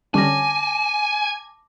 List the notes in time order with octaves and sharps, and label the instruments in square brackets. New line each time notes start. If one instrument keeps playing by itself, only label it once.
[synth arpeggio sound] D3 G3 C#4 [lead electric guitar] G#5 [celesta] A5 D6 A#6